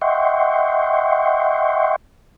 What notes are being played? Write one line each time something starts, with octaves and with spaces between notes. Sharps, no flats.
D#5 E5 F#5 G5 C6 C#6